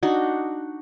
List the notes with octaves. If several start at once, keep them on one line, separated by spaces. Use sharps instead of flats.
D4 D#4 F#4